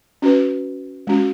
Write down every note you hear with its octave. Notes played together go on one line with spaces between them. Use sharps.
C#4 F#4 B4
G#3 C#4 F#4